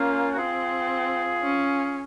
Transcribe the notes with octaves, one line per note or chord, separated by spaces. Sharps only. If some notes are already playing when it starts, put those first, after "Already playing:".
Already playing: A#3 C#4 F4
F#4
C4 F4 G#4
C#4